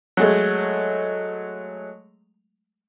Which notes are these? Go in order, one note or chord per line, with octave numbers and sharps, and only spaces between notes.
F#3 G#3 A3